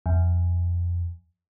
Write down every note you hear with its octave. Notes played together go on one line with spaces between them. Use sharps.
F2